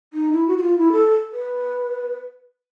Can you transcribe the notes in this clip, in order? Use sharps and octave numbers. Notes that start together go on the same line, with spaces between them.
D#4
E4
F#4
F#4
F4
E4
A4
B4